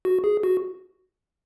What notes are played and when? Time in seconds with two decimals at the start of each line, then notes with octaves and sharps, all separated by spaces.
0.05 F#4
0.24 G#4
0.43 F#4